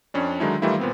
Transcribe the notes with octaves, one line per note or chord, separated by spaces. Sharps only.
F2 C#4 D4
D3 D#3 F#3 G#3 D#4 E4
D#3 E3 G3 A3 E4 F4
A#2 B3 C4